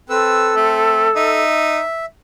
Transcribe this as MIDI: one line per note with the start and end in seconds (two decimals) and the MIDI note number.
0.10 0.55 60
0.10 1.41 69
0.10 0.55 71
0.10 0.55 88
0.56 1.08 57
0.56 1.07 60
1.16 1.81 63
1.16 2.05 76